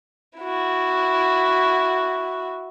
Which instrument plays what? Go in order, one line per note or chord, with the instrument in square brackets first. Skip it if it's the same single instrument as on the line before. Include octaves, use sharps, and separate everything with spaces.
[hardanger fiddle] E4 F#4